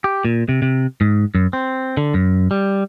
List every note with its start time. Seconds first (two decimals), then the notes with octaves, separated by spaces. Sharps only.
0.04 G4
0.25 A#2
0.49 C3
0.62 C3
1.01 G#2
1.35 F#2
1.53 C4
1.97 D3
2.14 F#2
2.51 G3